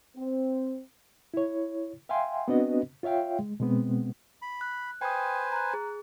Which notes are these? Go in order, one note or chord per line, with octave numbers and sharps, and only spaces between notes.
C4
E4 C#5
E5 F5 G5 G#5 C6
B3 C4 D4 F#4 B4 D#5
F4 C#5 E5 F5 G5
G#3
B2 G#3 B3 C4
B5
F#6
B4 C5 G5 G#5 C6 D#6
A#5 F#6
G#4